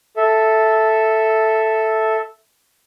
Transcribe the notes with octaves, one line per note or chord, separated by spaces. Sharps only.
A4 E5